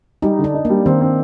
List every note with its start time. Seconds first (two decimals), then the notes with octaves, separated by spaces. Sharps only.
0.22 G3 D#4
0.38 D3
0.44 D4
0.54 D#4
0.65 G3 A#3
0.86 D#3 C4
1.01 C4